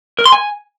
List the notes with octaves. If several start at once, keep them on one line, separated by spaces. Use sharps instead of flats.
A#4
C6
G#5